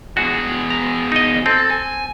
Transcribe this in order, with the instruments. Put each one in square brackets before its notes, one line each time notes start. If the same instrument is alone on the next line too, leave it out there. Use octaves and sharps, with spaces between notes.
[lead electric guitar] B2 G#4 [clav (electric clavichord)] F#4
[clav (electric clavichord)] A#5
D#4 D#5
[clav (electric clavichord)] C4 [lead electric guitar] A4
[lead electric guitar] G#5